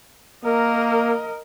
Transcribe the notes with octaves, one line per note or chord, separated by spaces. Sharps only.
A#3 A#4 D#5